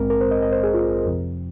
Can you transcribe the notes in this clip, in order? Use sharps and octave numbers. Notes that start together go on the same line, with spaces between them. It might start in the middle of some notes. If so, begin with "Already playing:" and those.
Already playing: A#1 G#2 G#3 C4 A#4
A#4
C5
D#5
D#5
C5
G#4
F4
F2 C3 F3 C4